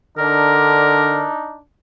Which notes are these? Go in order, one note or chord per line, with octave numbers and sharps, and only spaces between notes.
D3 D4 D#4 A#4